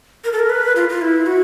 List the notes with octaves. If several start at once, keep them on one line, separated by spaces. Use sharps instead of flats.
A#4
A4
A#4
B4
F4
F4
E4
F#4